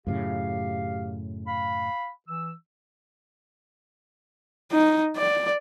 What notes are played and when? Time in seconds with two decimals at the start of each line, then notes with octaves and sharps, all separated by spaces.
0.07 F#2 A2 C#3 G4 F5
1.47 F5 B5
2.28 E3 E6
4.72 D#4
5.17 D5